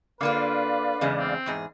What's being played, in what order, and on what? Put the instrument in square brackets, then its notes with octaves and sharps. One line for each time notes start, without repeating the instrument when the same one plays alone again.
[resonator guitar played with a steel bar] D3 A#3 F4 [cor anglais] B4 [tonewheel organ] D5 F5
[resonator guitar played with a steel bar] E2 C#3 G#3
[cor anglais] C4
[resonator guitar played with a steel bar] E2 G#2 G#4